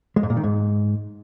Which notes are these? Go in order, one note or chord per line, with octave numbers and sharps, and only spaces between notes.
G#3
G#2
A#2
D#3
G#2